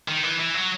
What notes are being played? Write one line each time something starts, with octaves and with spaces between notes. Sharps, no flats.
D#3
E3
E3
F#3